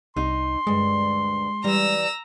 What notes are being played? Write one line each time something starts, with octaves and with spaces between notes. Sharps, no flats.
C2 D#4 C6
D2 G2 G#3
E3 G3 A#5 E6